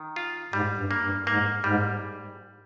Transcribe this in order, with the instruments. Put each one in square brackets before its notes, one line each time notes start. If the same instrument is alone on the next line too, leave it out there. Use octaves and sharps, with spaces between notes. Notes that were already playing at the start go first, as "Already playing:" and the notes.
Already playing: [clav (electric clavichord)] D#3
F4
[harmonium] G#2 [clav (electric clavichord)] G3
[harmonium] G2
[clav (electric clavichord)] A#3
[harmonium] G2
[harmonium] G#2 [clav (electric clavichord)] A#3
[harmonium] G#2 [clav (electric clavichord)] G3